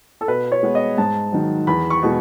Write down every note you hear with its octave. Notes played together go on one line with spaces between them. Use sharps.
A4
B2 B4
C#5
G#3 B3
D#5
G#2 A5
D#3 F#3
E2 B5
C#6
B2 G#3